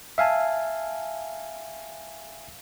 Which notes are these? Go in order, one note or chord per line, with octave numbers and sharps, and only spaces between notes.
E5 F5 G#5 A5